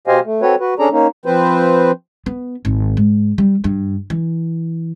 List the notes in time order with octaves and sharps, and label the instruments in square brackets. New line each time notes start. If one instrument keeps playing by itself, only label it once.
[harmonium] B2 G4 C5 D#5 F5 G#5
A3
C4 F#4 A4 B4 C#5
F#4 B4
C#4 D4 G#4 A4 D5 A#5
A#3 C#4 D#4
F3 C4 B4 C5
[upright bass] B3
G#1
G#2
G3
G2
E3